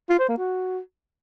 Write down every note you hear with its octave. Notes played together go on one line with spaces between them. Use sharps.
F4
C5
A#3
F#4